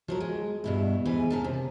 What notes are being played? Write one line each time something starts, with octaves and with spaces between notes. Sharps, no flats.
F3 F#3 A#4
G#3
G2 B2 E4
G#2 E3 G#4 B4
C#3 A#4 A5
C3